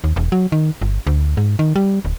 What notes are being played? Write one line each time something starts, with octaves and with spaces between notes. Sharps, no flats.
D#2
E1
F#3
D#3
G1
D2
G#2
D#3
G3
D1